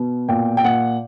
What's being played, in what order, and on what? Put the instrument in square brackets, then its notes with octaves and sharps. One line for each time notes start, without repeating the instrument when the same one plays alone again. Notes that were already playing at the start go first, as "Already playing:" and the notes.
Already playing: [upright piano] B2
A#2 G5
G5
A#2 F#5